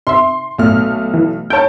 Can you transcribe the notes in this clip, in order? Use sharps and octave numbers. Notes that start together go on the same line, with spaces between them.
C3 E5 C6
B1 A#2 A3 F6
E3
C#5 G5 A5 G6